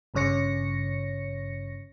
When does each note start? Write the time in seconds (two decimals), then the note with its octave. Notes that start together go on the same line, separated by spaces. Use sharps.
0.14 G#1 G2 C#3 C#5 A#6 C#7